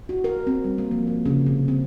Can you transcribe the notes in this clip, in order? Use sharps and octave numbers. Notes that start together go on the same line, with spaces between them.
F#4
A#4
C4
G3
A#3
F3
A#3
C#3
C3
C4